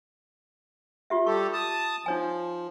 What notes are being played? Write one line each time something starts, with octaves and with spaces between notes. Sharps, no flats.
F4 G4 E5
G3 G4 A4 C#6
A5 D#6
F3 D#4 C#5 G#5